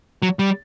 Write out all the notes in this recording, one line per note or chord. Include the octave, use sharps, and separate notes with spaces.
F#3
G3